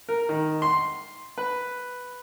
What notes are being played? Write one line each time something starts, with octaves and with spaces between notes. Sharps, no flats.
A#4
D#3
C6
B4